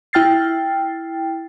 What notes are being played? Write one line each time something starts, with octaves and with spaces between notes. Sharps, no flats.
E4 G5 F6 A6 C7